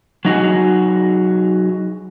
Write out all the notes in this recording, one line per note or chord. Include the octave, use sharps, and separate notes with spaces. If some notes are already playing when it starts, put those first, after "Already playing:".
F#3 D#4 F#4 G#4